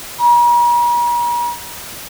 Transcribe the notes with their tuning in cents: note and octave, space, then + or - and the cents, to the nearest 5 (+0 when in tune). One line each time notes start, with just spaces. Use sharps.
A#5 +45